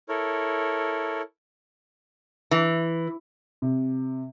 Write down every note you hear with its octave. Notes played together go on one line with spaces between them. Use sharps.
E4 A4 A#4 C#5
E3
C3